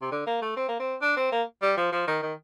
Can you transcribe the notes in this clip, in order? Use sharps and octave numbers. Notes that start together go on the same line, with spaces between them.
C3
D3
A#3
A3
C4
A#3
C4
D4
C4
A#3
G3
F3
F3
D#3
D#3